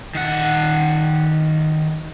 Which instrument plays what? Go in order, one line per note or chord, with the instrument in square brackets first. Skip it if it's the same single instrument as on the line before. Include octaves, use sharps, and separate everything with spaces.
[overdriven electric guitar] D#3 F#5